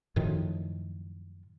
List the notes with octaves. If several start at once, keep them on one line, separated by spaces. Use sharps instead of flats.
F#2 A2 D#3 F3